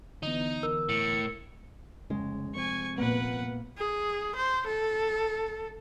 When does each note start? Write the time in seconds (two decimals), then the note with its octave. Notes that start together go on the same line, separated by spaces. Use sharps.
0.23 D3 E3 B3 D#4
0.63 A#4 E6
0.89 A2 C#7
2.10 F1 C#3 G#3
2.55 F1 F2 C4 G#5 C#6
2.98 A#2 A#3 B3 B4 F#5
3.78 G#4
4.35 C5
4.67 A4